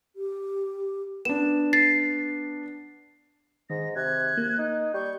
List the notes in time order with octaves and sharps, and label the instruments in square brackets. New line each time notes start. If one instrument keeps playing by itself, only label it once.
[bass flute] G4
[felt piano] B3 D4 [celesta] E7
[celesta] A6 C7
[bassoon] G#2 [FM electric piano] D#3 [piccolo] A#6
[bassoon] C3 [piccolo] F#6 [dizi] G#6
[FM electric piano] A#3
[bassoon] D#4
[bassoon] G3 [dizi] C#6 [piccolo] G6